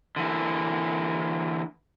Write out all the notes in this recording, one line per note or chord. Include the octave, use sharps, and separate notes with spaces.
D3 E3 A#3